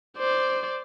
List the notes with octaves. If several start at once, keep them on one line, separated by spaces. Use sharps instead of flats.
C5 D5